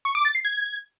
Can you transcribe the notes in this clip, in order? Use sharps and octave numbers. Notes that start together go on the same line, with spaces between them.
C#6
D6
A6
C7
G#6